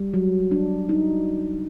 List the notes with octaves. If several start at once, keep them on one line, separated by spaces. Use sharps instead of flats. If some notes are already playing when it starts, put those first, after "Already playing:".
Already playing: G3
F#3
D4
D#4